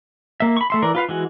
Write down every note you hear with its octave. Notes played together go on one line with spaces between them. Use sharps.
A#3 E5
B5 C#6
A3 E5 C6
E3 A#4 D5
F4 B4 F5
E3 G#3 F#4